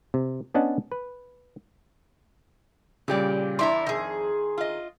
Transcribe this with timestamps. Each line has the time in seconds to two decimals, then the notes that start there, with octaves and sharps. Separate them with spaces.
0.14 C3
0.54 B3 C#4 D4 D#5 F#5 A5
0.92 B4
3.08 A#2 C#3 G3 G4 D5
3.59 E2 D4 E4 D5 A#5 C6
3.87 F2 D#3 G#4
4.58 F4 D#5